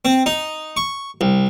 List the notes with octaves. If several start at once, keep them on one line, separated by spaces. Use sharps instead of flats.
C4
D#4
C#6
C2